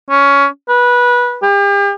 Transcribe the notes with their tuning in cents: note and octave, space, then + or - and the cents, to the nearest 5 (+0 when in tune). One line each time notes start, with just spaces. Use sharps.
C#4 +15
B4 -20
G4 +40